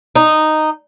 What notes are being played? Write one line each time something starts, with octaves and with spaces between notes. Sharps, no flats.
D#4